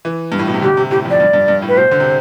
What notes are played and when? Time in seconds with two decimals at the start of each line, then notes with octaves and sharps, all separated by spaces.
0.05 E3
0.32 G2
0.39 A2
0.47 B2
0.54 C3
0.62 D3 G4
0.77 C3
0.90 A2 G4
1.05 F2
1.10 D5
1.20 G2
1.33 G2
1.48 G2
1.62 A2
1.68 B4
1.77 B2 C5
1.91 D3
2.00 C3